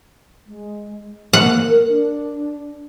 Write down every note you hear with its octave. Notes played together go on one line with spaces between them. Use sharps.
G#3
A#3 F#5
A#4
D4